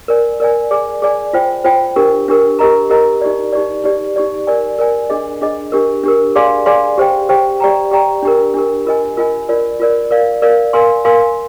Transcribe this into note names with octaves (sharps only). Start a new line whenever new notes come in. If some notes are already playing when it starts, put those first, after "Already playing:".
A#4 D5 G#5
A#4 D5 G#5
G#4 D5 G#5
G#4 D5 G#5
F4 C5 G5
F4 C5 G5
D4 G4 A#4
D4 G4 A#4
G4 A#4 D#5 A#5
G4 A#4 D#5 A#5
D#4 G4 D5
D#4 G4 D5
D#4 G4 D5
D#4 G4 D5
A#4 D5 G#5
A#4 D5 G#5
D4 G#4 D#5
D4 G#4 D#5
D4 G4 A#4
D4 G4 A#4
G#4 D5 F5 G#5 C6
G#4 D5 F5 G#5 C6
G4 C5 G5
G4 C5 G5
G4 D5 G5 A#5
G4 D5 G5 A#5
D4 G4 A#4
D4 G4 A#4
F4 A#4 D#5 G#5
F4 A#4 D#5 G#5
F4 A#4 D5
F4 A#4 D5
A#4 D5 F5
A#4 D5 F5
A#4 F5 G#5 C6
A#4 F5 G#5 C6